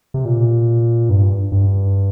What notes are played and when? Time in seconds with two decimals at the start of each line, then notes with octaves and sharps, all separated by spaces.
0.14 C3
0.25 A#2
1.09 G2
1.52 G2